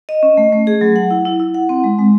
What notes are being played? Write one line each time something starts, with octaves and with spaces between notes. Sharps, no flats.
D#5
C#4
A3
A3
G#4
F#3
F#5
E4
E4
E4
F#5
C4
G#3
G#3